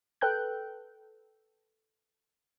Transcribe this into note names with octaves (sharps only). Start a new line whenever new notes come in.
A4 B4 G5 F#6 G6